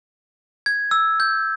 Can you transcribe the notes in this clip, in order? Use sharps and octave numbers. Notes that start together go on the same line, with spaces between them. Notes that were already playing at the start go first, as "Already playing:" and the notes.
G#6
E6
G6